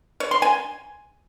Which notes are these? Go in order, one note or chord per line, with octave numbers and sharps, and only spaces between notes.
C#5
C6
G#5